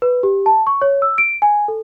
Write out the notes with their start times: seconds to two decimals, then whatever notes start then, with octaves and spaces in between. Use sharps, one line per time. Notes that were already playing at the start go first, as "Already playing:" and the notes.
0.02 B4
0.23 G4
0.46 A5
0.67 C#6
0.82 C#5
1.02 E6
1.18 D7
1.42 G#5
1.68 A4